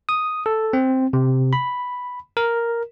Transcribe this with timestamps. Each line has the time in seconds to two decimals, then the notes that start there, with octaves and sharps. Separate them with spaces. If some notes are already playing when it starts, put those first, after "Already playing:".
0.09 D#6
0.46 A4
0.73 C4
1.13 C3
1.53 B5
2.37 A#4